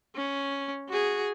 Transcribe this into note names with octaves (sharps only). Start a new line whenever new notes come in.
C#4
F#4 G#4